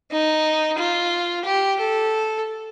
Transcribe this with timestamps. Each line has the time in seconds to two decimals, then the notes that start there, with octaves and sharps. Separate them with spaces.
0.11 D#4
0.78 F4
1.45 G4
1.79 A4